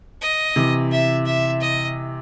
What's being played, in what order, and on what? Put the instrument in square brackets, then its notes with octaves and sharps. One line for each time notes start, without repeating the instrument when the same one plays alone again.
[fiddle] D#5
[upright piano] C3 E3
[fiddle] E5
E5
D#5